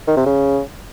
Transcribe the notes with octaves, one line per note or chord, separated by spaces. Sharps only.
D#3
C3
C#3